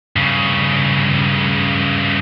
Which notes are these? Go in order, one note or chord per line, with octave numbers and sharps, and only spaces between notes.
G2 C#3